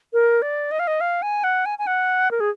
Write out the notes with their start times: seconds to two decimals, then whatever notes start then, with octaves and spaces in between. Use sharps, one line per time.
0.13 A#4
0.42 D5
0.71 D#5
0.79 F5
0.87 D#5
1.01 F5
1.22 G#5
1.44 F#5
1.65 G#5
1.78 G#5
1.87 F#5
2.31 A#4
2.40 G#4